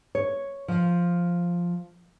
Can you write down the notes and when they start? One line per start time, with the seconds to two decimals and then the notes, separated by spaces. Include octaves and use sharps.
0.15 C#5
0.68 F3